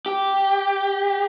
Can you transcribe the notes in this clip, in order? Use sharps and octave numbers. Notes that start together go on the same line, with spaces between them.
G4